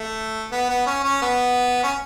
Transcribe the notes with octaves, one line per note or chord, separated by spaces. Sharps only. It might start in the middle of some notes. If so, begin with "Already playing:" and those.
Already playing: A3
B3
B3
C#4
C#4
B3
C#4